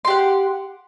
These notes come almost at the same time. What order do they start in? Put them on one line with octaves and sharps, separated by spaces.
C6 G4 F#5